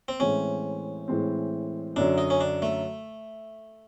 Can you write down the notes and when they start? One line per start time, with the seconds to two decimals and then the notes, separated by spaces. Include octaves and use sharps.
0.08 C4
0.19 A2 E3 G#3 C4 C#4
1.08 A2 E3 G#3 C4
1.96 F#2 D3 F#3 D4
2.18 D#4
2.30 C#4
2.41 D4
2.62 A3